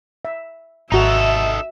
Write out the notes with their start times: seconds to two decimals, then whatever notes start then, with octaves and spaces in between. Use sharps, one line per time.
0.25 E5
0.92 G#1 D#4 F#4 A4 E5 A#5